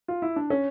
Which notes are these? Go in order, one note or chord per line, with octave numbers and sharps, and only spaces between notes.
F4
E4
D4
C#4